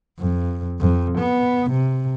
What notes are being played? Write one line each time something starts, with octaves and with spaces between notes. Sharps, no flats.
F2
F2
B3
C3